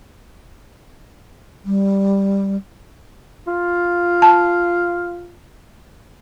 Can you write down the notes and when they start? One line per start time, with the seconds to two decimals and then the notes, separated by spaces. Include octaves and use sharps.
1.65 G3
3.48 F4
4.22 A5